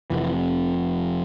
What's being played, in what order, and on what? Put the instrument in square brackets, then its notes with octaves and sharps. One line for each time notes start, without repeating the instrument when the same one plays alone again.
[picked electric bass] F1 F2 C3 E3